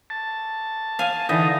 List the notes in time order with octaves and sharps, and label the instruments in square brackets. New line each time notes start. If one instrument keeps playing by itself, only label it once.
[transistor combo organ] A5
[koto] F5 G#5
[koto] D3 E3 [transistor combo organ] D#4